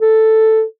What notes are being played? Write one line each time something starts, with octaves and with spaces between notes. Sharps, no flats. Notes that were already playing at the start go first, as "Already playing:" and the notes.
A4